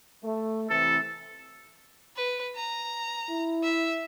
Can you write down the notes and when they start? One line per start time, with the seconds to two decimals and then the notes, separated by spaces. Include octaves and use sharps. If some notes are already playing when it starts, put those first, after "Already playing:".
0.23 A3
0.70 C3 E3 A4
2.16 B4
2.56 A#5
3.29 E4
3.63 E5